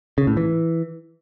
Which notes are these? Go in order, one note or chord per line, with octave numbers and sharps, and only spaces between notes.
C#3
A2
E3